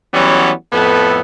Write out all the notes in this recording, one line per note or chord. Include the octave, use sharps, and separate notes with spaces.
E3 F#3 G3 B3 C#4
F2 A2 B3 A4 B4